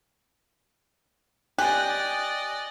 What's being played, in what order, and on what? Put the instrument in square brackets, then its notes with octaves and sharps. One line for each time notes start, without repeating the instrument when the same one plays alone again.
[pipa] G4 [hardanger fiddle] D5 D#5 [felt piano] G#5 [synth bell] F#6